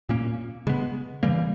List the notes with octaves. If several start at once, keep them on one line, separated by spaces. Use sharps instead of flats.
A#2 A#3 C#4
C#3 G#3 B3
C#3 E3 G3 A#3